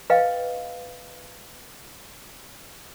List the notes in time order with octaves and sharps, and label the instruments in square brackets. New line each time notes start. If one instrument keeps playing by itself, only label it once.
[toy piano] B4 D#5 F5 G5